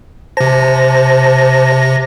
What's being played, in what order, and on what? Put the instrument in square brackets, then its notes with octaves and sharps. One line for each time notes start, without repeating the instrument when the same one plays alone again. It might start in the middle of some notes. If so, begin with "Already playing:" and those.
[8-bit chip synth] C3 A#6 [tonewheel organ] C5 A5